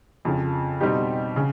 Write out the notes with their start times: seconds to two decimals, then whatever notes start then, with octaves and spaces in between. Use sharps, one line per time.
0.25 F2 C#3 F3
0.80 B2 G3 C4 D#4 G4
1.36 C#3